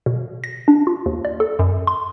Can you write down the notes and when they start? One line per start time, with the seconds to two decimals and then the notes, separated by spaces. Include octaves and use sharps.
0.06 B2
0.44 A#6
0.68 D4
0.87 F4
1.06 D#2
1.25 D5
1.40 A4
1.59 F#2
1.87 C6